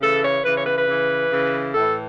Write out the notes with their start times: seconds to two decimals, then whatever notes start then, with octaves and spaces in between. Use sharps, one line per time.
0.01 C#3 E3 A4
0.23 C#5
0.44 C#3 E3 B4
0.56 C#5
0.66 B4
0.77 B4
0.88 C#3 E3
1.31 C#3 E3
1.75 A2 E3 A4